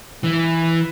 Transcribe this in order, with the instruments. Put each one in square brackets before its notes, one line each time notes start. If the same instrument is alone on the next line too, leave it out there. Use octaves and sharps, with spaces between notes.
[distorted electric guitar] E3